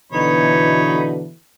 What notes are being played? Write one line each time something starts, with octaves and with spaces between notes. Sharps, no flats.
B2 D3 E3 D#4 C#5 B5